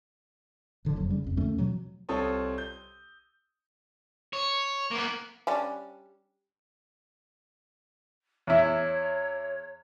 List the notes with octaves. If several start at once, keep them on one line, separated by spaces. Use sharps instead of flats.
G1 D3 F3
F#1 F2 F3 F#3
C#3 G3 C#4
G#1 F2
D#2 D3 A3 C#4
B2 F3 F#3
C2 C4 F4 A4 C#5 D#6
G6
C#5
A#3 B3
G3 C#4 D4
E2 E4 C#5